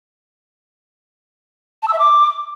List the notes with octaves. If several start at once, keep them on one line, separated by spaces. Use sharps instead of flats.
A5
E6
E5
D6